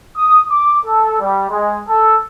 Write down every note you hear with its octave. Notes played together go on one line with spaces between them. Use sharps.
D#6
D6
A4
G3
G#3
A4